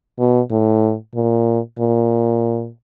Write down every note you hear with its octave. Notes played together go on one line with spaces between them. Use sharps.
B2
A2
A#2
A#2